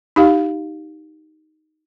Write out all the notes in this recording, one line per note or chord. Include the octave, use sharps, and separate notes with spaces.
D#4 G4 F5